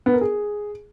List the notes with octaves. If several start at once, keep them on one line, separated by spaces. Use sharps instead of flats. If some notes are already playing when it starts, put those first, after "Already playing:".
B3
A#4
G#4